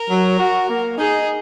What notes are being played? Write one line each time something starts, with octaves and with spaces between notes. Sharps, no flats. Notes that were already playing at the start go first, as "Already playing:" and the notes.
Already playing: A#4
F#3
F#4
A#3
D#4 G#4